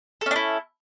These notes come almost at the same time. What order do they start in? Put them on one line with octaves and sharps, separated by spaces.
A4 C#4 D4 E4